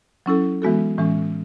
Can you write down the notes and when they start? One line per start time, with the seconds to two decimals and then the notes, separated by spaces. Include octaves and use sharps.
0.26 F#3 C#4 E4 A4
0.62 E3 G#3 B3 F#4 A4
0.98 A2 E3 G#3 C#4